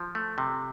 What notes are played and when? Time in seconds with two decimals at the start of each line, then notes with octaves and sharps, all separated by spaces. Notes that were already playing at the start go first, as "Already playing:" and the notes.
Already playing: F3
0.15 A3
0.38 C3